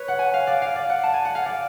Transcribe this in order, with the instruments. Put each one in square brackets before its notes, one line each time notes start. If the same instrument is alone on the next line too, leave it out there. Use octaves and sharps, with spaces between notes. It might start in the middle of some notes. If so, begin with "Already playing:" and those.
Already playing: [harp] B4 C#5
F#5
G#5
F5
D5
F5
D5
F#5
A5
G#5
F#5
F5
D5